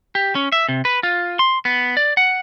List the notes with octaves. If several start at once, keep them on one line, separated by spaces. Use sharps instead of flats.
G4
C#4
E5
C3
B4
F4
C6
B3
D5
F#5